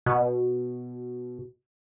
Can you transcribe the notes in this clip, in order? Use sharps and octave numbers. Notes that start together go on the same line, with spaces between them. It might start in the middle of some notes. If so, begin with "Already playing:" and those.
B2